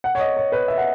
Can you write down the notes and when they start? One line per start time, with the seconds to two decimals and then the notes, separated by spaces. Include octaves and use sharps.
0.04 F#5
0.15 C#5
0.20 D#5
0.37 C#5
0.52 B4
0.68 E5
0.78 F#5